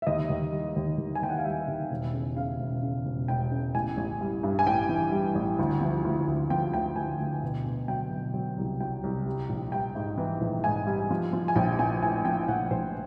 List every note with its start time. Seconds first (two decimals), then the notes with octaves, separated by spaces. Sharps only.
0.02 E5
0.07 D#2 D#5
0.30 D#2
0.52 G3
0.76 D#2
0.98 D#2
1.15 G#5
1.22 D#2 G5
1.30 F#5
1.38 F5
1.45 G3 E5
1.68 D#3
1.91 E1
2.13 C#3
2.36 C#3 F5
2.60 E1
2.83 C#3
3.05 E1
3.28 E1 G5
3.52 C#3
3.75 A1 G#5
3.97 A1
4.21 G3
4.43 G2
4.59 G#5
4.66 A1 G5
4.89 E3
5.12 G3
5.35 A1
5.59 D2
5.81 F3
6.05 D2
6.27 D2
6.50 F3 G5
6.73 D2 G5
6.96 D2 G#5
7.19 D2
7.43 B2
7.66 B2
7.88 F#3 G5
8.11 B2
8.34 F#3
8.58 C2
8.80 F#3 G5
9.03 C2
9.26 G3
9.49 A#1
9.72 G3 G5
9.95 G#2
10.18 E3
10.41 A#1
10.64 G#2 G#5
10.87 G3
11.11 F3
11.33 F3
11.48 G#5
11.56 A#1 G5
11.79 F3 G#5
12.02 A2 G#5
12.25 F3 G5
12.48 A#1 F#5
12.71 A#1 C5